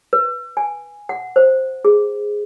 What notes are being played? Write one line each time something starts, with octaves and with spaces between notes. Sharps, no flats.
B4
G#5
F#5
C5
G#4